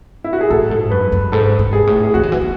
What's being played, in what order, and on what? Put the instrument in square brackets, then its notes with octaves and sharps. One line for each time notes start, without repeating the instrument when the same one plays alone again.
[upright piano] E4
F#4
G#4
[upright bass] A2 [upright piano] A4
[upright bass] G#2 [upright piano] A4
[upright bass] F#2 [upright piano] B4
[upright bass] F#2
[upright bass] G#2 [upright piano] A4
[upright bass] G#2
[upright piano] G#4
[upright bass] A2
[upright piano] G#4
[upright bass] E3 [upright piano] F#4
[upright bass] D#3
E3
B3